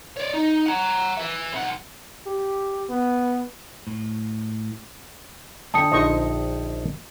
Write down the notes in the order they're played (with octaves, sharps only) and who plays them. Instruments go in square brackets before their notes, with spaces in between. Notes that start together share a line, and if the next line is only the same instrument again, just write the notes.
[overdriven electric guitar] C#5 D5
D#4
F#5 A#5
B4 E5
B1 F#5
[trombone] G4
B3
[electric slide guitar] A2
[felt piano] D3 G5 [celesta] A5 D#6 C#7
[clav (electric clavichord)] A#1 D#4 C5 [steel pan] D#5 C#6